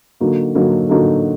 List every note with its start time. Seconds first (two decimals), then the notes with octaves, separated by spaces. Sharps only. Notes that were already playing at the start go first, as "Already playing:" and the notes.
0.20 D3 F#3 A#3 D#4 F#4
0.55 D3 F#3 A#3 D#4 F#4
0.89 D3 F#3 A#3 D#4 F#4